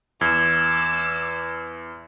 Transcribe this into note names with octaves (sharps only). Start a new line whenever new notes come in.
E2 D6 E6 G#6